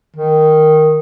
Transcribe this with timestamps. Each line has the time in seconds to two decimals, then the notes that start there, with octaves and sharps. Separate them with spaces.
0.16 D#3